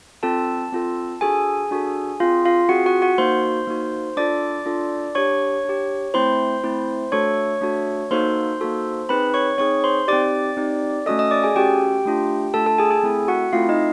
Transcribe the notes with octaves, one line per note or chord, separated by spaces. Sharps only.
C4 F4 A4 A5
C4 F4 A4
D4 F#4 G#4 A4 G#5
D4 F#4 A4
C4 F4 G#4 F5
F4 F5
C4 F4 F#4 G#4 F#5
F#4 F#5
F#4 F#5
A#3 D#4 F#4 C5 C6
A#3 D#4 F#4
D4 F4 A4 D5 D6
D4 F4 A4
D4 G4 C#5 C#6
D4 G4
A3 C4 E4 C5 C6
A3 C4 E4
A3 D4 F#4 A4 C#5 C#6
A3 D4 F#4 A4
A#3 D#4 F#4 A4 C5 C6
A#3 D#4 F#4 A4
C4 D#4 G#4 B4 B5
C#5 C#6
C4 D#4 G#4 C#5 C#6
C5 C6
C4 D#4 G4 D5 D6
C4 D#4 G4
A3 C#4 F#4 A4 D#5 D#6
D#5 D#6
D5 D6
G#4 G#5
A3 C#4 F#4 G4 A4 G5
A3 D4 F4
A3 D4 F4 A4 A5
A4 A5
G#4 G#5
G#4 G#5
A3 C4 E4 A4
F#4 F#5
A3 C4 E4 F4 A4 F5
D#4 D#5